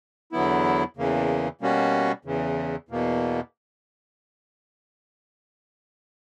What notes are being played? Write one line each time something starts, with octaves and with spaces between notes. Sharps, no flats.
E2 D3 F#3 B3 E4
E2 C#3 E3 A#3
B2 G3 A#3 C#4 F#4
E2 C#3 E3
E2 B2 A#3